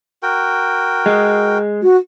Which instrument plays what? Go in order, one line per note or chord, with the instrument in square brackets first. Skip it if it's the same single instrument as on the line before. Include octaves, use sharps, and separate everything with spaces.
[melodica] F#4 A#4 G5
[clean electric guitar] G#3
[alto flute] F#4